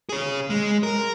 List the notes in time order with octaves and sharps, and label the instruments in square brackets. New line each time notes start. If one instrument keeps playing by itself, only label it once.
[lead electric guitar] G#4 C#5
G#3
A#4